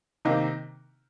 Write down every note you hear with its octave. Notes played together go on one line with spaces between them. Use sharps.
C3 D#3 A#3 D#4